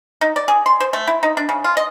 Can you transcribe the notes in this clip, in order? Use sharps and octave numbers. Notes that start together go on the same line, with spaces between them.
D#4
D5
G#4
C6
C5
A3
E4
D#4
D4
C#3
F4
D#5